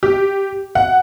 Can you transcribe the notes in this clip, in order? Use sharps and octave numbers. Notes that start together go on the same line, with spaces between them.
G4
F#5